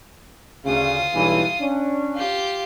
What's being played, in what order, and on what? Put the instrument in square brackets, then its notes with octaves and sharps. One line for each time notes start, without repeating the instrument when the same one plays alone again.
[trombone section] D2 C#3 [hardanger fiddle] F4 D#6
[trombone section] B1 G2 E3
C#4 D4
[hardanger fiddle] F4 G4